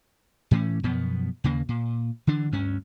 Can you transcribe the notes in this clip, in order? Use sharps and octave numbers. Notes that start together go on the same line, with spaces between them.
A2 E3 A3 C#4
F#2 B2 F3 B3
D#2 C#3 A#3
A#2
D3 E3 D4
D2 G2 C#4